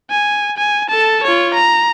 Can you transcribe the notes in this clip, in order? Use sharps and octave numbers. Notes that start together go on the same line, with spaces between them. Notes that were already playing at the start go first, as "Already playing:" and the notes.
G#5
G#5
A4 A5
F4 C#5
A#5